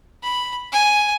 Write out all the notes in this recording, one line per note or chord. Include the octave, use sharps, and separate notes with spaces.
B5
G#5